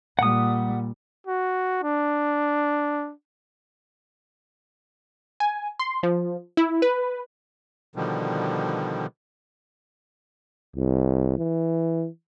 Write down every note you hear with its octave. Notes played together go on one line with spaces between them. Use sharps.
A#2 G3 F#5 D#6
F#4
D4
G#5
C6
F3
E4
B4
B2 D3 D#3 F3 G3
C2
E3